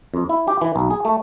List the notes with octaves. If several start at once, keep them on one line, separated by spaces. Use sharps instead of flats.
F2
E4
G4
E3
B1
G#4
A3